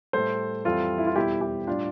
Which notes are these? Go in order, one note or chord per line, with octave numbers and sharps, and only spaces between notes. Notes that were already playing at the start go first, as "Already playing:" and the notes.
A2 G3 A4 C5
F2 E3 G3 F4 A4
E4
F4
E2 B2 G3 E4 G4
E4 G4
A2 G3 D4 F4